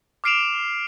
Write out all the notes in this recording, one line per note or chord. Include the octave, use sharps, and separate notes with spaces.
D6 F6 C7 D7 E7 F7